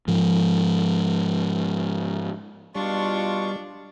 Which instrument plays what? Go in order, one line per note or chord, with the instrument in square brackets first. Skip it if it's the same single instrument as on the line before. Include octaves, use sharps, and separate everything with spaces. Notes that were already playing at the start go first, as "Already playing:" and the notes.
[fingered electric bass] G#2 F3
[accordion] B2 F4 C#6 [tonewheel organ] G3 [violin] D4